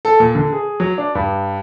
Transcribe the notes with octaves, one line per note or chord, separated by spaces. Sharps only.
A4
A#2
D3
G#4
F#3
D4
G2